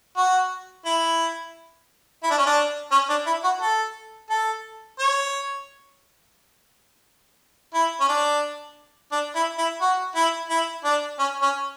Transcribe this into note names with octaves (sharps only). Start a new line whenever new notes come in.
F#4
E4
E4
D4
C#4
D4
C#4
D4
E4
F#4
A4
A4
C#5
E4
C#4
D4
D4
E4
E4
F#4
E4
E4
D4
C#4
C#4